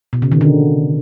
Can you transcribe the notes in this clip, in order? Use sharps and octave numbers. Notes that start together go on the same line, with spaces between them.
B2
C#3
D#3
D3